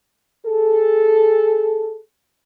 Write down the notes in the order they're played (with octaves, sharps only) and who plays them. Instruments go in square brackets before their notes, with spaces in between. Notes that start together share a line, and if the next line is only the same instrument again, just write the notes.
[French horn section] G#4 A4